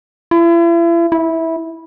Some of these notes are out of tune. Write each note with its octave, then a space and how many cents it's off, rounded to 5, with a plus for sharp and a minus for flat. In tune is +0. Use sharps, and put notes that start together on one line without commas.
E4 +40
E4 -15